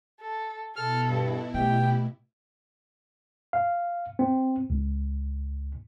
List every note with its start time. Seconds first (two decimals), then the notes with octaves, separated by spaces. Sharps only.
0.20 A4
0.76 B2 E4 A4 F6
1.08 G2
1.54 A3 G4 G5
3.53 F5
4.19 C4
4.70 C#2